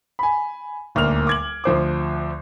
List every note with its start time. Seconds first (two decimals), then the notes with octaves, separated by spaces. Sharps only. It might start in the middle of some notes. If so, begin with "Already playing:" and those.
0.19 G#5 B5
0.95 D#1 D2 A#3 F6 F7
1.27 D6 G#6 F#7
1.64 D2 F3 C5 D6